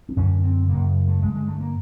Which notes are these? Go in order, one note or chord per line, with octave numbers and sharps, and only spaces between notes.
C4
F#2 D3 C#4
C4
F#2 C#3 A#3
A3
G2 D3 G#3
G#3
A3
A#3